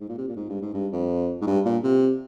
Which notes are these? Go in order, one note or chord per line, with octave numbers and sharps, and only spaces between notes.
G#2
A#2
C3
A#2
G#2
G2
G#2
G2
F2
G#2
G2
A#2
C3